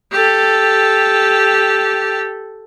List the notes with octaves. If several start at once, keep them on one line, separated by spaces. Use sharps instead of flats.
G4 A4